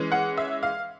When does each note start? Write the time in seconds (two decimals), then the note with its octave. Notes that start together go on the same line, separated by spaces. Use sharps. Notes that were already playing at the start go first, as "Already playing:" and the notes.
Already playing: E3 G#3 C#4
0.12 F#5
0.37 E5
0.63 F5